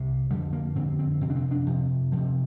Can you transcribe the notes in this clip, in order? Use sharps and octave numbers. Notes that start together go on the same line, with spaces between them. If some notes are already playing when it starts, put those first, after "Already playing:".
Already playing: C2 C3
F2 D3 G3
A#3
F2 D3 C4
C4
F2 C3 C4
D4
C4
D4
F2 C3 F3
F2 C3 F3